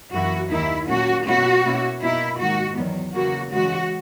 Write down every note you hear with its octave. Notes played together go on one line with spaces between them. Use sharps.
F#2 E3 A#3 E4 F#4
D#2 D#3 A#3 D#4 E4
A#2 F#3 A#3 C#4 F#4
B2 A#3 C#4 E4 F#4
B2 A#3 C#4 E4
B2 A#3 D#4 E4
G#2 D#3 A#3 F#4
E2 D#3 F#3 B3
C#3 E3 A#3 F#4
C#3 E3 G#3 F#4